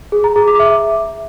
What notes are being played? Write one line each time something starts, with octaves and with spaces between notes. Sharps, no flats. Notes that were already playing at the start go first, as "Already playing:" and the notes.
G#4
A#5
G#4
D6
E5